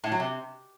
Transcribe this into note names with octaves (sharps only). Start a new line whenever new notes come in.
A2
F#3
C3